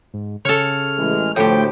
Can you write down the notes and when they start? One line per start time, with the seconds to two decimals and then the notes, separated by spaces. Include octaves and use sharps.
0.14 G#2
0.45 C#3 A4 C#5 F6
0.98 A1 E3 G#3
1.36 D2 A2 F3 A3 G4 C5 G5